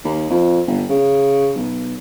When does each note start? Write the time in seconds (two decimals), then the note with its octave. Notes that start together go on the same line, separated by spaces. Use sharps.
0.04 D#2
0.30 F2
0.67 G1
0.89 C#3
1.55 B1